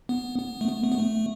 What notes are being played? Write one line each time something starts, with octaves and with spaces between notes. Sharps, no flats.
B3
B3
A3
B3
A3
B3
A3